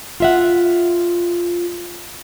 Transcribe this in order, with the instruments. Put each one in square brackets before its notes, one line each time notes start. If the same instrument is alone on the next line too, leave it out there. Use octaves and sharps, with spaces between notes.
[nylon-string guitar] F4 E5 F#5